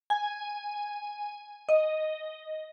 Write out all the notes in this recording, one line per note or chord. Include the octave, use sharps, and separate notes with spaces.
G#5
D#5